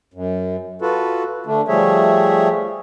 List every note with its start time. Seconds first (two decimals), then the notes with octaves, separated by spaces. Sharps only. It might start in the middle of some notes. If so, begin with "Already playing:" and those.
0.14 F#2
0.82 F4 F#4 A4 B4
1.46 D3 A3 D4
1.68 F3 G3 A3 G#4 C#5 E5